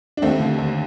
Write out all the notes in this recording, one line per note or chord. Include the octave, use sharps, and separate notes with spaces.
D4
D#2 A3 C4
D3
D#2